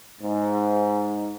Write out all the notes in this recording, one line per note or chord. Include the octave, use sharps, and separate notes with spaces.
G#2